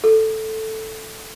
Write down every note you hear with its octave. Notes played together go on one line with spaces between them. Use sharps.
A4